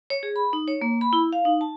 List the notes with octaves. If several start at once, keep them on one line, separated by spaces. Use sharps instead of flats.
C#5
G#4
B5
D#4
C#5
A#3
B5
E4
F5
D#4
A5